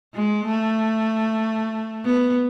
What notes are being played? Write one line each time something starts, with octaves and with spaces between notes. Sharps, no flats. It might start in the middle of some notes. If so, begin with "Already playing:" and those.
G#3
A3
B3